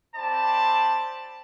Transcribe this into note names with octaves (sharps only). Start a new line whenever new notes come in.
C4 G4 C5 D5 A5 B5